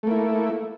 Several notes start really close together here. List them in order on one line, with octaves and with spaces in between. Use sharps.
A3 A#3 E4